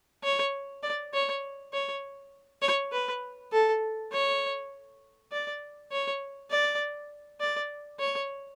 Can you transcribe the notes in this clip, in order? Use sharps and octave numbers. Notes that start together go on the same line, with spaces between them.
C#5
D5
C#5
C#5
C#5
B4
A4
C#5
D5
C#5
D5
D5
C#5